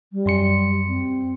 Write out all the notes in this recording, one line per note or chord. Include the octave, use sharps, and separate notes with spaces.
G3
F#2 C6 C#7
C4